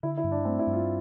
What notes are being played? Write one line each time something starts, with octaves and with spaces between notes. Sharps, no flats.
D3 E4
E4
G2
D4
A3 C4
E4
G2
F4